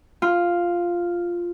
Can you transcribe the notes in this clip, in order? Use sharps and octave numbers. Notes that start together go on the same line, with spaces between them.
F4